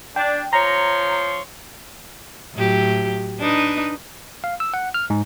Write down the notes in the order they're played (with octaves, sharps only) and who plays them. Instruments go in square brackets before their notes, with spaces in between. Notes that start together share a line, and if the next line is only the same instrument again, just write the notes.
[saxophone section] D4 [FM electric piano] G5
[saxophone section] F3 C5 C#5 [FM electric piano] A#5
[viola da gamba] A2 F#3 G4
D4 D#4 B4
[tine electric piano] F5
E6
F#5
F6
G#2